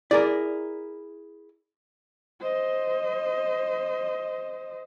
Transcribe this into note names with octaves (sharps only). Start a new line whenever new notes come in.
E4 G#4 A#4 D5
C5 D#5